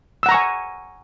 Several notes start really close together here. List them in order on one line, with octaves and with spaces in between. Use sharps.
E6 F#5 A#5 C#6 G#5